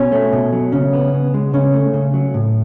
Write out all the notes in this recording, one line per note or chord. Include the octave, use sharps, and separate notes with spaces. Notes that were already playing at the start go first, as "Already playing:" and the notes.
Already playing: B2 C#4
A3
B2
F#3
C#3 C#4
B3
C#3
G#3
C#3 C#4
A3
C#3
F#3
A2